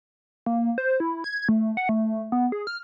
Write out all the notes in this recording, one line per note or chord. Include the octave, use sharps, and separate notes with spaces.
A#3
C5
E4
G#6
A3
F#5
A3
B3
G#4
F6